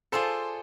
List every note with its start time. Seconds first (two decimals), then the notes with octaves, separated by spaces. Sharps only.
0.12 F4 G#4 A4 C5 D5 A5